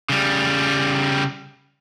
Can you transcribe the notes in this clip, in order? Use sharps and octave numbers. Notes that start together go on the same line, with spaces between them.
C#3 G3